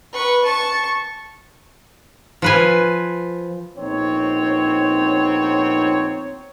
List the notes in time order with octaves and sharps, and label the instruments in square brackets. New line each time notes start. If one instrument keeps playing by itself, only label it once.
[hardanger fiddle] B4 C#6
A5 C#6
[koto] F3 B4 G#5
[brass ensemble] A#1 B3 C4 D#4 C#5